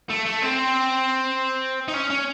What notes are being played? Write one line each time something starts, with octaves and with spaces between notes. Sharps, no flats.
A3
A3
C4
D#4
C#4
C#4